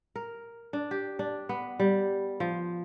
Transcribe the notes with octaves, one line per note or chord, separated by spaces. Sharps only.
A#4
D4
G4
D4
B3
G3
F3